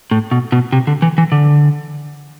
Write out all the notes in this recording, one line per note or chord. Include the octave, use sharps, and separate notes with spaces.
A2
B2
B2
C3
D3
E3
E3
D3